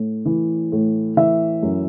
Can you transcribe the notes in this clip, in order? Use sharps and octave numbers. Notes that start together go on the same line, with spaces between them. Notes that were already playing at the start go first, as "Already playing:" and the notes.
Already playing: A2
E3
A2
E3 E5
F#2